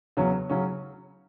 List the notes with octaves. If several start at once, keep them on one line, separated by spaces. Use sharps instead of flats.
E2 C#3 F#3 C#4
C#3 F#3 C#4